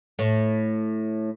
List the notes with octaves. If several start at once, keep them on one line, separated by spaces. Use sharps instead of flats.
A2 A3